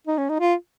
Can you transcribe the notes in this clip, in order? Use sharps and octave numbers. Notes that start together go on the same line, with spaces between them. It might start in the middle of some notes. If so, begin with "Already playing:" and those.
D#4
C#4
D#4
F4